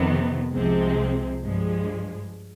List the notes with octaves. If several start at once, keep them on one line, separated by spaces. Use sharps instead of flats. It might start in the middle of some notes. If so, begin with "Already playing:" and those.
Already playing: F2 C3 D#3 B3
C2 C3 F3 G#3 C4
G2 F3 G#3